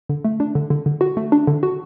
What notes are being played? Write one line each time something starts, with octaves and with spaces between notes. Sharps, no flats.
D3
A3
D4
D3
D3
D3
F#4
A3
D4
D3
F#4